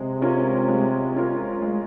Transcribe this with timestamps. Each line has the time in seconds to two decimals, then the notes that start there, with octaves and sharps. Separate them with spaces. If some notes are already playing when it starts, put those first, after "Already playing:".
Already playing: C3 G#3
0.22 C#4 F4 A#4
0.68 G#3
1.15 C#4 F4 A#4
1.62 G#3